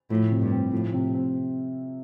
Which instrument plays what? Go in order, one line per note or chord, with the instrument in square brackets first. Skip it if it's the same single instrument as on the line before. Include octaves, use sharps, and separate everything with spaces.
[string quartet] A2 [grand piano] F3
[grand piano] C3
[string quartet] G2
[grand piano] C4
[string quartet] A2 [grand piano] F3
[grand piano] C3
C4